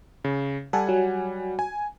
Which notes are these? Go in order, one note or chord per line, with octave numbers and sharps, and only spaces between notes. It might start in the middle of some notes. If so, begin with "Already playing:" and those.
C#3
G3 A4 F#5 G#5
F#3
G#5